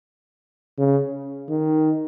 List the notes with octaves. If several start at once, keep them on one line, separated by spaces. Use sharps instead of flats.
C#3
D#3